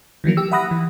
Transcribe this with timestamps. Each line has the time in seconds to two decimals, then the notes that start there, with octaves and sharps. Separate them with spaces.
0.24 D#3 E3 F#3 A#3
0.37 G4 E6
0.52 E5 F#5 B5 D#6 F#6 A#6
0.71 E3